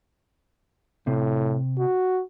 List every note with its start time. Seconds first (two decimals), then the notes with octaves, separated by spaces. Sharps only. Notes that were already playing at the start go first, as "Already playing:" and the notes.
1.07 A2 C3
1.79 F#4